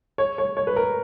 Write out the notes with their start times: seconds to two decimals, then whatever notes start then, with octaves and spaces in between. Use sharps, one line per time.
0.18 C#5
0.38 C#5
0.57 C#5
0.67 B4
0.76 A#4